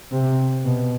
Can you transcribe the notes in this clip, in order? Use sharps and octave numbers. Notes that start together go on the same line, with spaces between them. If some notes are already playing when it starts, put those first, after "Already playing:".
C3
B2